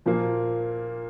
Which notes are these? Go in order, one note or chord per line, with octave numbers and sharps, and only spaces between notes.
A#2 F3 A#3